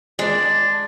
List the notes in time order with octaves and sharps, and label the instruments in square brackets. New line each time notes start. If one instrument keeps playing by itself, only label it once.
[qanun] G#3 D5 [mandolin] D4